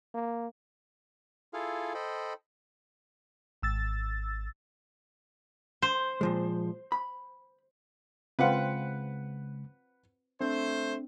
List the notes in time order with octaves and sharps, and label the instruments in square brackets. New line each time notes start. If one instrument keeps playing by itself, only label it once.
[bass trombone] A#3
[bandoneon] E4 F4 G#4 A4 F5
A4 C5 D#5 G5 B5
[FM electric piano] G#1 E6 A6
[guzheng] C5
[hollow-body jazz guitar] A#2 F3 G#3
B5
[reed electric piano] C#3 G#3 [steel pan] C4 F4 [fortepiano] B4 F#5
[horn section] A3 C5 [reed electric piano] C4 D4